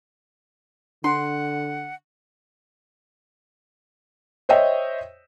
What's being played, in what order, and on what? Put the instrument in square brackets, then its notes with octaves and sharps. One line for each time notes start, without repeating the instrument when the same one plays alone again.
[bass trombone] D3 [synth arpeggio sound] D4 [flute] F#5 [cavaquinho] C6
[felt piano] C5 C#5 D#5 E5 G5